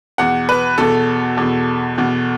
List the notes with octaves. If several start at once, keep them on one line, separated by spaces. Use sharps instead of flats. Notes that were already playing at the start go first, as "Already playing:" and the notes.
E2 B2 F#5
B4
E2 B2 A4
E2 B2
E2 B2